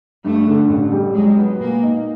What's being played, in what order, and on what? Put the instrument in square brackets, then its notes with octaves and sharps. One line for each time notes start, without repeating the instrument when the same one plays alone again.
[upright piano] G2 [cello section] A3
[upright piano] D3
A1
G3
[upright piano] F#3 [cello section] G#3
[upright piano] B3
[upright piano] A#2 [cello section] A#3
[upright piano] D#4